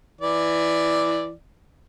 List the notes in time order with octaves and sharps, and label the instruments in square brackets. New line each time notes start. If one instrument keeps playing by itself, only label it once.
[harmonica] E3 D5